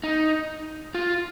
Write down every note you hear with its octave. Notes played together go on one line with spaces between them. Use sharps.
D#4
F4